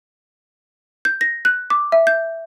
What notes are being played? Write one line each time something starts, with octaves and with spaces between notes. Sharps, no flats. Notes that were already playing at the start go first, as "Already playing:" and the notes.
G6
A#6
F#6
D6
E5
G6